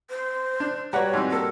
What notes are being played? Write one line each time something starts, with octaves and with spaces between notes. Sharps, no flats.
C5
D4
G3 F#4 B4 C#5 F#5 A#5
G#2 E3 C4
A#3 A4 A#4